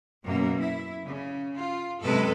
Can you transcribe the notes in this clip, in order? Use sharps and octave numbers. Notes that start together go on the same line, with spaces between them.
F#2 B2 A#3
E4
C#3
F4
F#2 C3 G#3 A4 B4